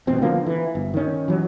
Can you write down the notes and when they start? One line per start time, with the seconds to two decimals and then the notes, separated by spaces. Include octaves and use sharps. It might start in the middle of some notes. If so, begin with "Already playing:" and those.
0.07 D#1 A1 B2 C4
0.22 D3 F3 A#3 B3
0.46 E3
0.75 G1
0.94 D#3 C#4
1.28 E3 F#3